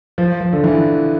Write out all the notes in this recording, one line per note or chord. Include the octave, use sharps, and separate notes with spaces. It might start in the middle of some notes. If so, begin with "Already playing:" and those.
F3
F3
D3
E3